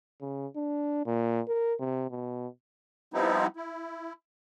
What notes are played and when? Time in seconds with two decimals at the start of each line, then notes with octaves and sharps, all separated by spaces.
0.21 C#3
0.56 D4
1.06 A#2
1.48 A#4
1.80 C3
2.11 B2
3.14 F3 G3 B3 C4 D#4 E4
3.56 E4